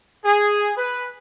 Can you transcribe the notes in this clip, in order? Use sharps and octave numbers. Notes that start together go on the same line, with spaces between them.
G#4
B4